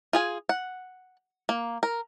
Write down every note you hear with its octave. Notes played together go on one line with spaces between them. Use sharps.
F4 G#4 G#5
F#5
A#3
A#4